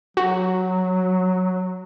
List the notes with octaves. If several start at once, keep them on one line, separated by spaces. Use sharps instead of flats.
F#3 F#4